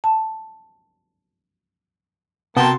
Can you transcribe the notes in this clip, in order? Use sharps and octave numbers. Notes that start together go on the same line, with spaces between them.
A5
C3 A#3 B3 F#4 G5 A5 C6